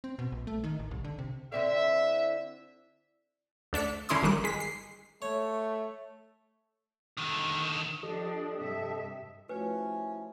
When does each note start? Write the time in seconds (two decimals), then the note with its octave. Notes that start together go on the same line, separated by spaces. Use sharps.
0.04 C4
0.19 B2
0.32 A#1
0.47 A3
0.64 D#3
0.79 A1
0.91 C2
1.04 D3
1.19 C3
1.52 D3 C4 E4 E5
3.73 D2 D4 B6 C#7
4.09 D3 C#4 E4 C6 D#6
4.22 G1 D#3 G3 F#6
4.44 G#3 B6
4.60 C7
5.22 A3 C#5
7.17 D3 D#3
8.03 F3 D4 G4 A4 D#5
8.58 G2 C3 E5
9.49 F3 A3 C#4 E4 F#4 B4 C#5